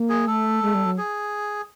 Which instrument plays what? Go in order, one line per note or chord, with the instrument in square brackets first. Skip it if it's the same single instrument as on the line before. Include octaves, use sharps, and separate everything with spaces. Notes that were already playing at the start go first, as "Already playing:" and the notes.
Already playing: [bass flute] A#3
[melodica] G#4
[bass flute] A3 [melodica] A4
[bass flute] G#3
G3
F#3
[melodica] G#4